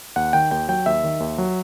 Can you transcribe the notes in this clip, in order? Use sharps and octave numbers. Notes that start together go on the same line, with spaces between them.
D#2 F#5
D#3 G5
D#2 G5
F#3 G5
D#2 E5
D#3
D#2
F#3